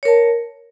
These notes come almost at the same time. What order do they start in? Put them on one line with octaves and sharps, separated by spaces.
C#5 A#4 A5